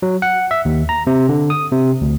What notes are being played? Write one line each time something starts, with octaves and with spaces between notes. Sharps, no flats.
F#3
F#5
E5
D#2
A#5
C3
D3
D#6
C3
D2